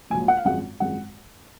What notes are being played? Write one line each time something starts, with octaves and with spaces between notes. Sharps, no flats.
A#1 G#2 F#3 G#5
F#5
F5
G#1 F#2 F3 G#3 F#5
G#1 F#2 F3 G#3 F#5